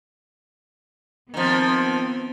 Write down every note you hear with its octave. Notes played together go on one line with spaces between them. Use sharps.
D#3 F3 B3 C4